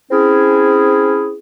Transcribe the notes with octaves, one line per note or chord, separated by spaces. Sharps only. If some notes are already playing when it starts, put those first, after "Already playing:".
C4 C#4 E4 G#4